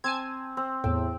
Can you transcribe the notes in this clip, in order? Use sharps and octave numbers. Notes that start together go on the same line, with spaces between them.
C4 G#5 A5 G#6
C4
E2 A2 G5